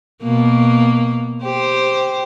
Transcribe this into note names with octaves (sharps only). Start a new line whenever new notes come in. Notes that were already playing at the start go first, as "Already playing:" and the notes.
B2 A#3
G4 C5